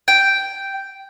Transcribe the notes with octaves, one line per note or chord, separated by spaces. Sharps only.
G5